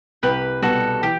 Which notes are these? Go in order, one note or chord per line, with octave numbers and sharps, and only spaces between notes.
C2 G4 B4
B2 G3 B3 F#4 A4
E3 G4